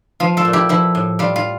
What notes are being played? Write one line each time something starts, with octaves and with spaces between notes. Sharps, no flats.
F3 F4
F4 A4
A#2
E4 G4
F3 E4
A2
G3 F4
F4